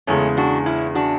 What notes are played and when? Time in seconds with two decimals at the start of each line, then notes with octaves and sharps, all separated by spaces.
0.07 E2 C#3 G#3 A3 C#4
0.37 D4 F#4
0.66 C#4 E4
0.95 D4 F#4